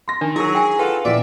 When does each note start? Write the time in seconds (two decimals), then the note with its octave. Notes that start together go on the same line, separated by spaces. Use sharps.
0.08 C6 A#6
0.21 D#3 D4 D#4
0.36 F#3 E4 G#4 A#4
0.55 G5 G#5
0.79 F4 A4 B4 F#5 G5
1.05 A#2 E3 B3 D5 E5